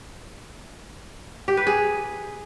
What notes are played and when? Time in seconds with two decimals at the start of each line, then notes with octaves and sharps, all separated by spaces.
1.48 G4
1.57 B4
1.67 G#4